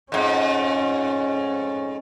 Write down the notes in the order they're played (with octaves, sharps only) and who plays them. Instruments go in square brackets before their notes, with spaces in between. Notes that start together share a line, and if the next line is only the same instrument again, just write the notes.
[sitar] F2 G#2 [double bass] C#4